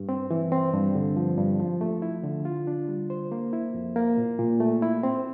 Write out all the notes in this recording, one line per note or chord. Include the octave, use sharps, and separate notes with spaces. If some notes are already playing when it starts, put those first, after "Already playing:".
Already playing: G2
C4
E3
C4
G2
D3
F3
G2
F3
A3
E4
D3
F4
D4
G3
C5
A#3
E4
F2
A#3
A#2
A#2
A3
E4
C4